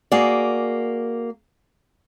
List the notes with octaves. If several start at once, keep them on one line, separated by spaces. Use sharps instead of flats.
A#3 F#4 G#4 D5